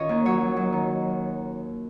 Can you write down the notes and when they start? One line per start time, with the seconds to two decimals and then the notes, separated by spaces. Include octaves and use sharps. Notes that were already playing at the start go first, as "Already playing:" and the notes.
Already playing: D#3 C#4 F4 A#4 C#5 D#5
0.09 D#2
0.25 F#3 C#5
0.41 F#3
0.56 F#3
0.73 D#3